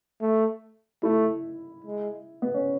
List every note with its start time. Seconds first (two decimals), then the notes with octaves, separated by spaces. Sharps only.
0.21 A3
1.03 A3 E4
1.85 G#3
2.42 B3
2.54 C#4